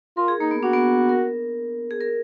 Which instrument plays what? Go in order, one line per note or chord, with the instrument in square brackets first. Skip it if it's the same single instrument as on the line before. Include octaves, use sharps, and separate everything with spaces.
[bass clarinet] F4 [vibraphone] A#4
[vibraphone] G#4
[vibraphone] A#3 [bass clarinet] D#4
[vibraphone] B3
[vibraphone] D4 [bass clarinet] F#4
[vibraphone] B3
A#4
G#4
A#4